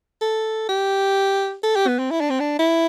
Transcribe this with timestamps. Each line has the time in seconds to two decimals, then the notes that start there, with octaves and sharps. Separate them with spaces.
0.21 A4
0.69 G4
1.63 A4
1.76 G4
1.87 B3
1.99 C4
2.11 E4
2.20 D4
2.30 C4
2.40 D4
2.59 E4